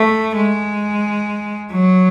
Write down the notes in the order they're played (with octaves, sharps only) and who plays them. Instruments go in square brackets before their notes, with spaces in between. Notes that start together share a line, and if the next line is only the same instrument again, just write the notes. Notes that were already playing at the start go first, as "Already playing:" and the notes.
Already playing: [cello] A3
G#3
F#3